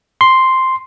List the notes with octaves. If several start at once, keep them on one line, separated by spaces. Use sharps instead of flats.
C6